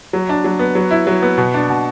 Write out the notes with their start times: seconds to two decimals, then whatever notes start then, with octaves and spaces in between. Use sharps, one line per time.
0.13 F#3
0.29 D4
0.44 F#3
0.59 B3
0.75 F#3
0.91 E4
1.07 F#3
1.22 B3
1.38 B2
1.54 D4
1.70 B2